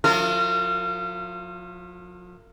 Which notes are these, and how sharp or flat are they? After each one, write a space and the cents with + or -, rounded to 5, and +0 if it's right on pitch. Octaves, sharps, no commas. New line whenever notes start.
F3 +45 F4 -30 A#4 -40